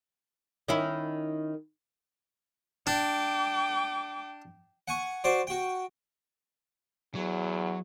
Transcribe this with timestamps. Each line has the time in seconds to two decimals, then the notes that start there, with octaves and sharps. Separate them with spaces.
0.68 D#3 C#4 E4
2.87 D4 G5 D6
4.88 F#5 G#5 C#6
5.24 F#4 C5 D5
5.47 F#4 G5
7.15 E2 F#3